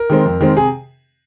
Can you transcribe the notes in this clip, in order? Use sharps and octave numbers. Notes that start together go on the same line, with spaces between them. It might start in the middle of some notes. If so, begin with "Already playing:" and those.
Already playing: A#4
D#3 G#3 C4
F2
D#3 G#3 C4
C3 G#4